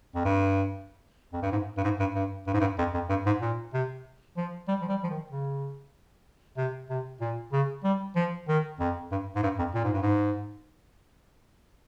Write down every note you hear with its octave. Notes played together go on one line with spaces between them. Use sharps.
F2
G2
F2
G2
G#2
G2
G#2
G2
G2
G2
G#2
G2
F2
F2
G2
G#2
A#2
C3
F3
G3
F3
G3
F3
D#3
C#3
C3
C3
A#2
C#3
G3
F3
D#3
F2
G2
G#2
G2
F2
A#2
G#2
G2
G#2